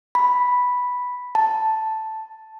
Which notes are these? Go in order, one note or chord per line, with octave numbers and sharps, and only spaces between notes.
B5
A5